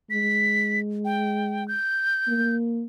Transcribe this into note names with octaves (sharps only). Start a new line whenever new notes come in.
G#3 B6
G5
G6
A#3